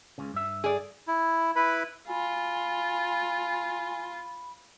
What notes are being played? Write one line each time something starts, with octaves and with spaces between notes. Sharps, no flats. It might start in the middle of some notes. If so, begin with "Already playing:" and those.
C#2 C#3
G2 E5
G#4 D5
E4
E4 B4 B5
F4 G#5 B5